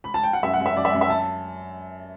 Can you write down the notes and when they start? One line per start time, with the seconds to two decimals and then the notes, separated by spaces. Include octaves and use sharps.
0.04 B5
0.14 A5
0.23 G5
0.33 F#5
0.43 F#2 E5
0.54 F#5
0.60 F#2
0.66 E5
0.76 F#2 D5
0.85 E5
0.93 F#2
1.01 E5
1.10 A5